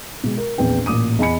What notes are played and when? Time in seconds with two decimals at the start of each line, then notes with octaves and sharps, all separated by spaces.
0.24 B2 G#3
0.38 A#4
0.58 A#1 E2 C4 B4 G5
0.86 A1 A#2 D6 D#6 D#7
1.19 E2 D#5 G#5 B5 C#7